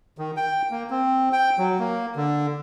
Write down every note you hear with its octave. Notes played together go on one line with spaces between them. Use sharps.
D#3
G5
A#3
C4
G5
F#3
A#3
D3